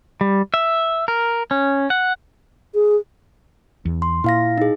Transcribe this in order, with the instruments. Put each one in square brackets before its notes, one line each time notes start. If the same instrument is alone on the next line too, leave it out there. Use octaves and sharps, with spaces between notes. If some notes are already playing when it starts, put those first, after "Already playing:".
[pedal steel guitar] G3
E5
A#4
C#4
F#5
[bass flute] G#4
[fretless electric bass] E2
[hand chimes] C6
[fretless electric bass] A#2 [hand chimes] E4 F5 A#6
[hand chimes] D#4 G#4